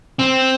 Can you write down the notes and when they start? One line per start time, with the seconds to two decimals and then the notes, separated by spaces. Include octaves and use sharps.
0.19 C4